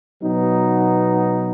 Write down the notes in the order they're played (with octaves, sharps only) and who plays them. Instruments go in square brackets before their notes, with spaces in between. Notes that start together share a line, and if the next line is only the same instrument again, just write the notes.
[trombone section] B2 F#3 B3 D#4